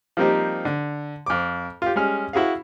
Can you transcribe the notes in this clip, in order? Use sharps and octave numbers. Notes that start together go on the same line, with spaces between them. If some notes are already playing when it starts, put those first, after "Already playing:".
F3 G3 A#3 C4 D#4 G4
D3
F2 D6
F4 G4
G3 G#3 C#4 F6
E4 F#4 G#4 F5